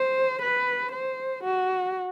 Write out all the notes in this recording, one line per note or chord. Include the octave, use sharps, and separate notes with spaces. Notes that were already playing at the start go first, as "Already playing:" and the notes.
Already playing: C5
B4
C5
F#4